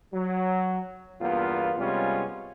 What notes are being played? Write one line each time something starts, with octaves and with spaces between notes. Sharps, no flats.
F#3
E2 G2 A#3 B3 F4
C3 G3 G#3 B3 C#4 F4